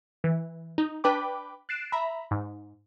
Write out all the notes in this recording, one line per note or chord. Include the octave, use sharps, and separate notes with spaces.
E3
D#4
D4 B4 G5 B5 D6
F#6 A6 C7 D7 E7
E5 A#5 B5
G#2